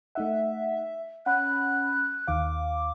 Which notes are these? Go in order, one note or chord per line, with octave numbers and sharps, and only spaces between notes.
A3 D#4 E5 F#5
C#4 F#5 B5 F#6
D#2 D#3 F5 D6